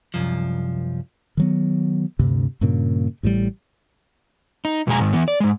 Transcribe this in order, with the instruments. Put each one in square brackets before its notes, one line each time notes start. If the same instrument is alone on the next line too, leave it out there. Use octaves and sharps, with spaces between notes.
[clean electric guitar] C2 F#2 F3
[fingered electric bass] D#3 F#3 B3
D2 G2 C3
G2 A#2 C#3 A#3
A1 A2 C3 G3
[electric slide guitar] D#4
F2 B2 G#3 G#4 G#5 A#5
G#2 D#3
E3 B3
D5
G#2 G#3